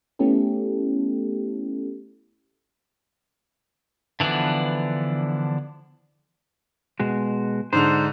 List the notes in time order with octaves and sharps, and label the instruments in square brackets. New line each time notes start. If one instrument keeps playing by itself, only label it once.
[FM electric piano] A3 B3 C#4 E4 G4 A4
[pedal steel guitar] D3 E3 F3 B3 D4
[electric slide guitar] B2 G#3 F#4
[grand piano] G#2 D3 F7 [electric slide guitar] C5